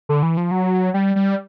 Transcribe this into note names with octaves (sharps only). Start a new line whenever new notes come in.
D3
E3
F3
F#3
G3
G3